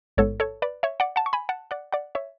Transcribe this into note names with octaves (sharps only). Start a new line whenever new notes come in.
A1 G#2 G#3 B3 A4 C#5
A4 C#5
B4 D5
C#5 E5
D5 F#5
F#5 A5
C#6
G#5 B5
F#5 A5
D5 F#5
D5 F#5
C#5 E5